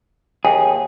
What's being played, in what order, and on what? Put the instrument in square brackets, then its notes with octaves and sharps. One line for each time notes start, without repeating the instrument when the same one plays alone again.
[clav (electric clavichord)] D#2 [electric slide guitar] G#4